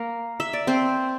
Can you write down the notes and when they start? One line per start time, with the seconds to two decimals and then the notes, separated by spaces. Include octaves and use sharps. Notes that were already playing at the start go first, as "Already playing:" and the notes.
Already playing: A#3 A#4
0.40 E5
0.53 D5
0.67 C4 C5